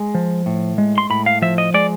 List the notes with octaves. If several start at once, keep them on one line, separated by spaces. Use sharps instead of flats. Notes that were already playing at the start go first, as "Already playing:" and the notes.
Already playing: G#3
F3
A2
G#3
C6
A2 B5
F5
F3 E5
D#5
G#3 D5